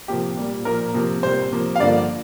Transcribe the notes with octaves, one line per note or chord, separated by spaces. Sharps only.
C3 F3 A#3 G4
A#2 G3 A#3
A#2 F3 A#3 A#4
C3 F3 A#3
C3 G3 A#3 C5
C3 F3 A#3
F5
G2 D3 F3 A#3 D5